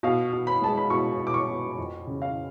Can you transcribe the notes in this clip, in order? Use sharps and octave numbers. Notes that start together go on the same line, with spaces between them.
B2 F5
B2
B5
G#3 A5
B5
B2 C#6
B2
D6
C#6
B2
F2
C#3
F5